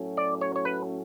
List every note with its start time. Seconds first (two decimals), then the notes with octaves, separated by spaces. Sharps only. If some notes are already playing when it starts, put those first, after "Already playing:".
Already playing: A2 F#3 A3 C#4 F#4
0.17 D5
0.41 C#5
0.56 C#5
0.65 B4